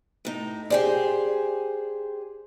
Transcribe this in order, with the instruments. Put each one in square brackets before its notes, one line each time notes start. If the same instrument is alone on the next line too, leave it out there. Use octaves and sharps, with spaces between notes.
[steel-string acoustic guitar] A2 D#4
[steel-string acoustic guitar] G4 G#4 C5 [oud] D5